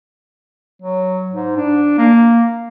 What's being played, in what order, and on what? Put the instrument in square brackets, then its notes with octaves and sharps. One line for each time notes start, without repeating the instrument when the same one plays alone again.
[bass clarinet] F#3
G#2
D4
A#3